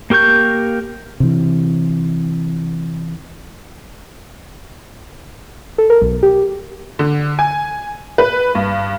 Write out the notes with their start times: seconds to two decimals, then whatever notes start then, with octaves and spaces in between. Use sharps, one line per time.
0.10 A#3 G4 A#4 C#6 G6
1.20 C3 E3
5.78 A4
5.90 A#4
6.01 B1
6.23 G4
6.99 D3
7.39 G#5
8.18 B4
8.55 G2